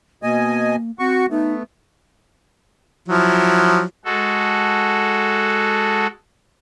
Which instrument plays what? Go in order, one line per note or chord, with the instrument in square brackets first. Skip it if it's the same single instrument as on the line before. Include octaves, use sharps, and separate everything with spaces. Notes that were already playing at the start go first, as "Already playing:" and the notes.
[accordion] B2 D#5 G#5 [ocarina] A#3
[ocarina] C4 [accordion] F#4 C#6
[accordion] A3 B3 [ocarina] D#4
[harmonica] F3 F#3 E4
[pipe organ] G#3 F#4 A4